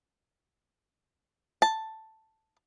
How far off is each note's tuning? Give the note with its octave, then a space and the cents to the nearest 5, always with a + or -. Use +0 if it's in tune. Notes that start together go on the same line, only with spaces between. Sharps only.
A5 +5